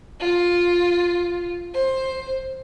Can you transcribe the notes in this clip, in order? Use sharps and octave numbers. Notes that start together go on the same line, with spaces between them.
F4
C5